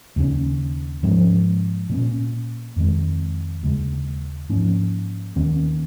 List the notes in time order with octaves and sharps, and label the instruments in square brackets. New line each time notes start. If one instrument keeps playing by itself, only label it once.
[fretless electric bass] D#2 C#3 A#3 C#4
G#2 F3 G#3 C#4
A#2 A#3 C#4
F2 D#3 G#3
D#2 C#3 G#3
G#2 F3 A#3 C#4
D#2 D#3 A#3 C#4